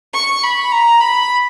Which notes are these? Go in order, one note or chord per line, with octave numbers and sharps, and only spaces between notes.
C#6
B5
A#5
B5